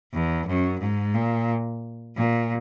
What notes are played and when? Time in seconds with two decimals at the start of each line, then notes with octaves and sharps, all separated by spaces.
0.13 E2
0.47 F#2
0.80 G#2
1.14 A#2
2.16 A#2